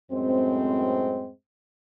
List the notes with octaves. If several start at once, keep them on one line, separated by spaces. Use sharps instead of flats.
F#2 A2 G#3 C4